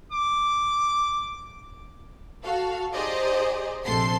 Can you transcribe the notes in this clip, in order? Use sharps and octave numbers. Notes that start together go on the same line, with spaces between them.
D6
F#4 A4 F5
D#4 G4 G#4 C5 D5 D#5
A#1 C3 A4 C6 C7